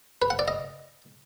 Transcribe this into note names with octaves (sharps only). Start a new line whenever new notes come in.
B4
F#5
D5
D#5